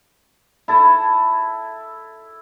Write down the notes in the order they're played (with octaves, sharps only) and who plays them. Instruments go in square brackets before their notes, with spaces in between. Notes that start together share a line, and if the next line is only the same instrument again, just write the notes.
[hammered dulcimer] E4 A4